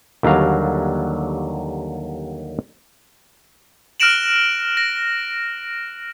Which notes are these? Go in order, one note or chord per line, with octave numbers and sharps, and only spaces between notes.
D#2 D3 F#3 G3 F5 A#5
F6 F#6 A#6 D7 E7 F#7
A#6